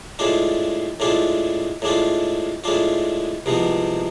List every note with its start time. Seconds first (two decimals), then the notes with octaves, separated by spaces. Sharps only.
0.19 A2 G#3 D4 F4
1.00 A2 G#3 D4 F4
1.82 A2 G#3 D4 F4
2.64 A2 G#3 D4 F4
3.46 C2 C3 F3 G#3 B3